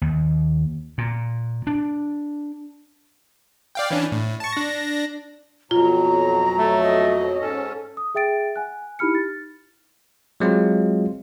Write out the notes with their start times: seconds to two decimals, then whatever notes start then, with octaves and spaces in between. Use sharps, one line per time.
0.01 D#2
0.98 A#2
1.67 D4
3.75 D5 F5 G5
3.90 E3 C#4 D4
4.12 A2
4.40 A5 C#6
4.52 D4 A#6
5.71 F2 B2 F#3 F4 A#5
6.58 A3
6.82 D#5
7.39 G#2 C#4 A4
7.97 D#6
8.15 G#4 E5 G5 A6 D7
8.56 F#5 G#5 F#6
8.99 D#4 E4 G4 B5 F6 C#7
9.15 A6
10.40 F#3 G#3 C4 F4